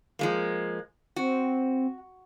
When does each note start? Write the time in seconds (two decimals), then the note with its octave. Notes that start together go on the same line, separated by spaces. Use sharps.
0.19 F3 G#3 A#3
1.16 C4 F#4